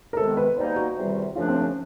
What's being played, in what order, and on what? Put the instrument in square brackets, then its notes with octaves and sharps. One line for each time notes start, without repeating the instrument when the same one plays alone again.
[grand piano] A#4
[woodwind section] C3 D#3 G#3 B3 [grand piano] A4
[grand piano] B4
[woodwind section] B2 G3 A#3 D#4 [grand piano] C5
[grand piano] F#4
[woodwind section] E2 C3 D#3 G3
[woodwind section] F#2 C#3 F3 A3 D4 [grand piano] F4
[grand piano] C4
C#4